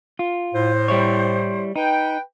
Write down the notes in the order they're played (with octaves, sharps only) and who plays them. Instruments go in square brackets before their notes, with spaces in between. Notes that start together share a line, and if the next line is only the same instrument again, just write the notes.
[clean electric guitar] F4
[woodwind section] A2 C5
[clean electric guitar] G3 E4 C#5
[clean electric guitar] D#4 [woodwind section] B4 G5